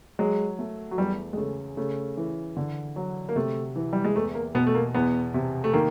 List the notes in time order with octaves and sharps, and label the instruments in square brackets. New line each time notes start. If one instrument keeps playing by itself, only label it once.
[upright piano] F#3 [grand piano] G#3
[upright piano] A3
[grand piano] F#3
[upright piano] E2 [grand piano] G3
[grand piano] G#3
[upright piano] C#3 [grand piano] A3
[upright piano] C#3 [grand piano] A3
[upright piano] E3
D3
F#3
[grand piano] A#3
[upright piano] C3 [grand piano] A3
[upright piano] E3
[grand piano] G3
G#3
[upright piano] E2 [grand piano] A3
[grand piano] A#3
[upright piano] B2 [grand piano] B3
[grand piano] A3
A#3
[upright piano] E2 [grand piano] B3
[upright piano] C3
[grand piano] A3
[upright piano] D#3 [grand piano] A#3